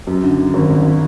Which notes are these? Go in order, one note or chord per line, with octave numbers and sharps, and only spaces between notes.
F#2
D3
D3
G#1
G#1